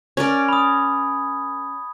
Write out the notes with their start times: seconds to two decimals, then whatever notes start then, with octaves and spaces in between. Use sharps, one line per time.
0.17 C#4 A#4 D5 G#6
0.49 B5 D#6